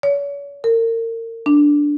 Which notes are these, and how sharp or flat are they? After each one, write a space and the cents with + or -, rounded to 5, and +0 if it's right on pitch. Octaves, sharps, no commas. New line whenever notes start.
C#5 +40
A#4 -35
D4 -5